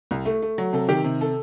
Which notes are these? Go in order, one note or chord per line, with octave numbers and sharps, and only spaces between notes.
C2
A3
A3
F#3
C3 A4
D#3 G4
C3
A4